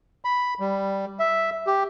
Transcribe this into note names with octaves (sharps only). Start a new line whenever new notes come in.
B5
G3
E5
G4